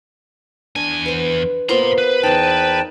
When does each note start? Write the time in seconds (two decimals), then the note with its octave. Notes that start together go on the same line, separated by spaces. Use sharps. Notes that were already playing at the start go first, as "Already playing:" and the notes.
0.76 E2 D4 G#5
1.06 B4 C5
1.69 A#3 B3 F4 C5 A#5 C6
1.98 B4
2.23 E2 D#4 A#4 G5 A5